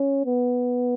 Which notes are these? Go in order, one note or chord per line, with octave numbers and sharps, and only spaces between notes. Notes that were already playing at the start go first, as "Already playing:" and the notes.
Already playing: C#4
B3